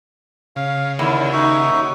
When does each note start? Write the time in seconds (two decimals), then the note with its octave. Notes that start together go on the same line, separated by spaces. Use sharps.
0.56 C#3 F5
0.99 D#2 D3 E4
1.32 D#4 F#4 E5